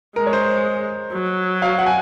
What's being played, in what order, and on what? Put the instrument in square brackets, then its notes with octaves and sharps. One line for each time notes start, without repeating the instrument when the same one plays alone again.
[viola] G#3 [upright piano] A#4
[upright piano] C#5
C5
[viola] F#3
[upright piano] F5
F#5
G#5